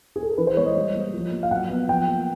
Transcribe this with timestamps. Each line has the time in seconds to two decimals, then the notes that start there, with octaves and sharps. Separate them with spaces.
0.16 G#4
0.23 A4
0.31 A#4
0.38 E3 B4
0.47 C5
0.57 G#3 C#5
0.66 D#5
0.76 G3
0.95 A#3
1.14 F3
1.32 A#3
1.43 F5
1.51 F#3 F#5
1.70 B3
1.88 F3 G5
2.08 A#3